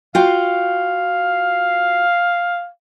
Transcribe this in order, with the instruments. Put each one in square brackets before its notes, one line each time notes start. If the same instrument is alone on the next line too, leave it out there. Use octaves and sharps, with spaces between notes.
[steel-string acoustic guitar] F4 F#4 G5 [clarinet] F5